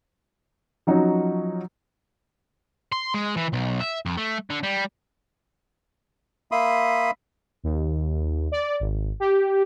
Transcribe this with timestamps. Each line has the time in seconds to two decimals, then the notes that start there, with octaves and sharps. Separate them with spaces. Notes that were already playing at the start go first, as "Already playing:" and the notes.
0.87 F3 F#3 C#4 D#4 F#4
2.92 C6
3.14 G#3
3.37 E3
3.53 B1
3.80 E5
4.06 F2
4.17 A3
4.50 D3
4.63 G3
6.52 A#3 E5 B5 C6 D#6
7.64 D#2
8.52 D5
8.80 G#1
9.20 G4